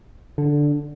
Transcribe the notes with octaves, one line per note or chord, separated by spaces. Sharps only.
D3